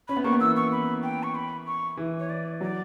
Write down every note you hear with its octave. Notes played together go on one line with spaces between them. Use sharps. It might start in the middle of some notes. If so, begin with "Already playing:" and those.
C#4 B5
B3
A#3 C#6
B3
E3 E6
C#6
B5
G5
C#6
B5
C#6
E3
C#5
D5
F#3 D5